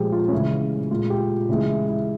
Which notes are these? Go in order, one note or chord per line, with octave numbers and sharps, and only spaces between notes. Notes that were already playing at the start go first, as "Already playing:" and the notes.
Already playing: A#2 F3 G#3 G4 G#4
F4
C#4
C#3 E3 G#3 E4
A#2 G#3 F4
G4
C#3 E3 G#3 E4
E4
E4